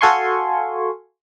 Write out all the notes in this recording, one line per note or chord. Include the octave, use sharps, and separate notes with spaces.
F#4 A4 F5 G#5 C6 C#6